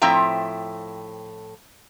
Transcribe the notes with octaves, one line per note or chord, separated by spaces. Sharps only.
A2 F3 C4 E5 G5 A#5